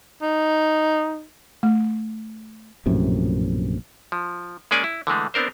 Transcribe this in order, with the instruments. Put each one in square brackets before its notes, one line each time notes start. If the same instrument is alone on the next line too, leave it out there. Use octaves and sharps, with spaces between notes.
[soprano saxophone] D#4
[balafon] A3
[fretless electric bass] A#1 F#2 A2 C3
[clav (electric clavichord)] F3
G#3 A#3 C#4 G#4 D5 G#5
E4
D3 E3 G#3 A3
B3 C4 D4 A#4 C5